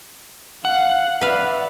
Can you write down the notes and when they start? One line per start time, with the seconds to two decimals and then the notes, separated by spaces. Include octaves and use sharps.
0.65 F5 F#5
1.21 B4 D5 E5 F5